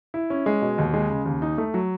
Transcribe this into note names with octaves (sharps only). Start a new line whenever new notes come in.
E4
C#4
G#3
B2
D#2
G#3
C#3
D#2
D#4
A3
F#3